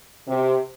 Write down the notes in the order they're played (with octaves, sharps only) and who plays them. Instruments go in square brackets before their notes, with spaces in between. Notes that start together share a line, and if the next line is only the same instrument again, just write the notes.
[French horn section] C3